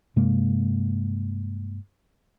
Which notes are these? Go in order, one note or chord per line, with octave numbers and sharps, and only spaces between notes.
G2 C3 G#3 A#3